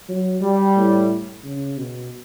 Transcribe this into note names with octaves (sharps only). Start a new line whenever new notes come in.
F#3
G3
A2
C#3
B2